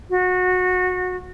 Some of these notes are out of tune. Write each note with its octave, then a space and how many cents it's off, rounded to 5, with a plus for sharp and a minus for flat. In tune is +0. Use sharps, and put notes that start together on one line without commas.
F#4 -20